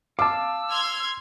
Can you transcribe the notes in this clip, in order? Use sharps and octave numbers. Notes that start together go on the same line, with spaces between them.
F5 A5 D6 E6
C6 F6 G#6